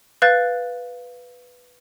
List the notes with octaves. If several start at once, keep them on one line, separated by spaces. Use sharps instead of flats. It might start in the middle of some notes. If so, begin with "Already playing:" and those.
B4 F5 F#6 G6 A6